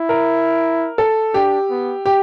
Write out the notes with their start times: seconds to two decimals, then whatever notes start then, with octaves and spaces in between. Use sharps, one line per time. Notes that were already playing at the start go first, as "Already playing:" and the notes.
Already playing: E4
0.09 A#4
0.98 A4
1.34 D4 G4
1.70 B3
2.06 G4